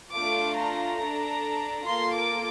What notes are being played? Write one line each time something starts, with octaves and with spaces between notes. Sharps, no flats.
A3 D4 F4 D6
A#5
D4 A4
A#3 F4 A4 C6
D6